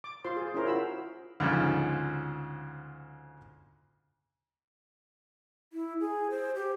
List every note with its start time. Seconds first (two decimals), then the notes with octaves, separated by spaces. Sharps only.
0.04 D6
0.24 F4 C5 C6
0.36 G#4
0.54 C#4 E4 A#4 C5
0.65 F4 F#4 B5 E6
1.40 D2 G#2 C#3 F3
5.73 E4
6.00 G#4
6.30 C5
6.55 G4